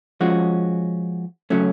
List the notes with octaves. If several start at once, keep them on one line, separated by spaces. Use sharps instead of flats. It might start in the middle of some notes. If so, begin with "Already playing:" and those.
F3 G#3 C#4 F#4
C#3 F#3 A3 C#4